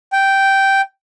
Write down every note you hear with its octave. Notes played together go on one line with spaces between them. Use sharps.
G5